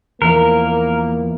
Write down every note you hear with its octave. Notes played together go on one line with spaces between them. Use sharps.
E2 E3 F3 A#3 E4 A#4